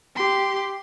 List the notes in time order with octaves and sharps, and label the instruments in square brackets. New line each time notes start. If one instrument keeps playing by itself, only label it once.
[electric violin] G4 C6